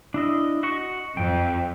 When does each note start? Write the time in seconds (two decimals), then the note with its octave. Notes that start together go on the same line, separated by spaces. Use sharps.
0.14 D4 E4 D#5
0.63 F#4 D#5 C#6
1.17 F2 G5